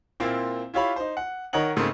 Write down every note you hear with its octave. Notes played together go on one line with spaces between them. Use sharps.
A#2 A#3 C4 E4 F4
E4 F4 G4 C#5 F5 B5
D#4 C5
F#5
D#3 A#4 C#5 D#5 F#5 F#7
G#2 C#3 A3 A#3 C4